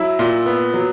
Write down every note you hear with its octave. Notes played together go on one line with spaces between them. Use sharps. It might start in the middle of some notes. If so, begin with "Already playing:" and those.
Already playing: F#3 E4
A#2
B3
F#3